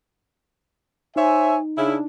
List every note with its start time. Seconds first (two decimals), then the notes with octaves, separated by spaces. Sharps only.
1.16 D#4 C5 C#5 E5 G#5
1.77 C#3 D4 E4